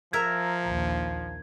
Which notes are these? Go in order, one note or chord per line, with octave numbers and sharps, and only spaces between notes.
F3 A#4 E5 A#5 G#6
A#1 D#2